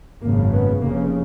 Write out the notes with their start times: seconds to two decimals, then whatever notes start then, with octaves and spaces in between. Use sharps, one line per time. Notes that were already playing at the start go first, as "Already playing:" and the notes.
0.22 G#1 F#2 C#3 A#3
0.52 B3
0.81 F1 F2 C#3 A#3